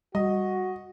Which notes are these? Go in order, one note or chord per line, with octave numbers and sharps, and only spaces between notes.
G3 F#4 D#5